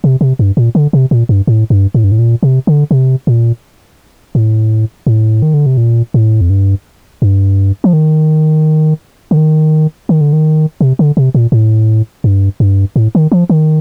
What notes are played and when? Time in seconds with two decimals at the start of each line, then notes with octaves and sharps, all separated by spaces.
0.04 C3
0.21 C3
0.39 G2
0.57 A#2
0.75 D3
0.93 C3
1.11 A#2
1.29 G2
1.47 A2
1.70 G2
1.94 A2
2.04 G2
2.12 A2
2.19 A#2
2.43 C3
2.67 D3
2.91 C3
3.27 A#2
4.35 A2
5.07 A2
5.42 D#3
5.54 D3
5.66 C3
5.77 A#2
6.14 A2
6.41 F2
6.50 G2
7.22 G2
7.84 F3
7.93 D#3
9.31 D3
9.37 D#3
10.09 D#3
10.21 D3
10.33 D#3
10.81 C3
10.99 D3
11.17 C3
11.35 A#2
11.52 A2
12.24 G2
12.60 G2
12.96 A2
13.15 D#3
13.32 F3
13.50 D#3